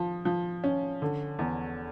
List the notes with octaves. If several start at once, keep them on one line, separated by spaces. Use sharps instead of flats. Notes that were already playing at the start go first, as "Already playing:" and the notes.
Already playing: F3
F3
C#4
D3
E2